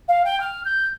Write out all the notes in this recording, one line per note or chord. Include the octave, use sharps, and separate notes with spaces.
F5
G5
F6
G6